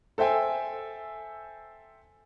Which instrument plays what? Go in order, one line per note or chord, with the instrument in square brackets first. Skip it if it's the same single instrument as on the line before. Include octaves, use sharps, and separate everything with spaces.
[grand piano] A4 C5 E5 G5 G#5